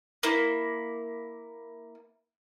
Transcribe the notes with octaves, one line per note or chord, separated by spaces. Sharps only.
A#3 E4